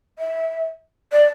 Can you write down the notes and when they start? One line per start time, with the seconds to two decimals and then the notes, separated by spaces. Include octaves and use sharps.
0.19 E5
1.12 D5